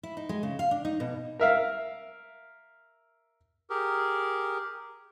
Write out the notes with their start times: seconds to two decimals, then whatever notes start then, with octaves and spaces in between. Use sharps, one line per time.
0.03 E4
0.17 D#4
0.29 G#3
0.43 C#3
0.59 F5
0.71 D4
0.85 D#4
1.00 B2
1.39 A#4 E5 F5
3.70 G4 G#4 A#4